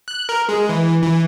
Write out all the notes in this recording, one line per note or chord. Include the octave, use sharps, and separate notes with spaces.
F#6
A#4
G#3
E3
E3